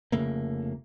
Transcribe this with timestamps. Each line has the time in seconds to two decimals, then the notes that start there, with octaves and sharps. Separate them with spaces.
0.12 F1 C#3 A3 A#3